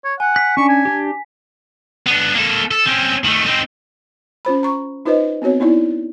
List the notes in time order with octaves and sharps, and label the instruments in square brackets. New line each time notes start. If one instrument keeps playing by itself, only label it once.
[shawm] C#5
[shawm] F#5 [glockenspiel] G#5
[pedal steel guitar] F#6 [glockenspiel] B6
[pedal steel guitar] C#4 D4 [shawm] C#6
[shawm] G#5
[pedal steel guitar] D4 G4
[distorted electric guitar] B3 D4
A#3 A4
A4
C4 C#4
D#3 A3
C4 D#4
[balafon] C#4 F4 C5 B5
A#5 C#6
D#4 F4 B4 C5 D#5
B3 C4 F#4 C#5
B3 D#4 E4 D5